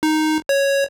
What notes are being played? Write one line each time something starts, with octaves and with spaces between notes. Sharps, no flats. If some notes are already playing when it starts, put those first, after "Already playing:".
D#4
C#5